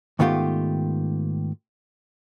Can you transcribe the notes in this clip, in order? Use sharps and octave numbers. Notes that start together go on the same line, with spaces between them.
G#2 D#3 A3 B3 F4 G4